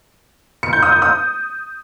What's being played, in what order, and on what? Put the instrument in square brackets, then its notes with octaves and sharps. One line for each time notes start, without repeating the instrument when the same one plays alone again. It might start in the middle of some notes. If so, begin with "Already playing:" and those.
[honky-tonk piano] C#7
G6
D#6
G6
D#6